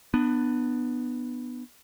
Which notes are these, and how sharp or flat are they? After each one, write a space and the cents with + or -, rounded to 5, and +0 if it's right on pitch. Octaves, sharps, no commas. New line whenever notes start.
B3 +0 D4 +30